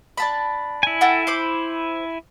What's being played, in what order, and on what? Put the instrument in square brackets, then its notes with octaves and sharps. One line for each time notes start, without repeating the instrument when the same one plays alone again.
[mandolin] D4 A5 B5
[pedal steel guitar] E4 G#5
[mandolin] A4 F#5 G5
C5 B5 D6